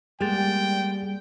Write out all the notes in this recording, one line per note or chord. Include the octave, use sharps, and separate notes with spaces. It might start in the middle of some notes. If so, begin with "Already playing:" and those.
G3 G#3 A#3 B3 G4 G#4 G5 A6